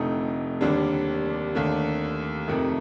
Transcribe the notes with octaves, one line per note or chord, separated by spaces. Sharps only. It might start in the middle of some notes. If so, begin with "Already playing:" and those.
Already playing: F1 F2 D3 A3 D#4
D#2 D3 G3 A#3 D4
D#2 D3 A3 D4
F2 C3 D#3 A3